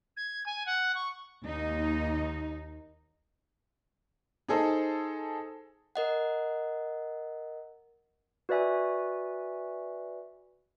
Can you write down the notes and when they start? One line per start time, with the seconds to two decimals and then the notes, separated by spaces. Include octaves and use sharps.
0.16 G#6
0.46 G#5
0.66 F#5
0.94 C#6
1.44 D#2 D#4
4.48 D#4 G#4 A4 C5
5.96 A#4 D#5 F#5
8.49 F#4 B4 D5 E5 G#5